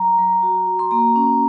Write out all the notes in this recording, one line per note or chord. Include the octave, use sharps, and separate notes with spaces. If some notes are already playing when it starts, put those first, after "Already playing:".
Already playing: F#3 A#5
F#3
F#4
F#4
C6
A#3 A#5
C#4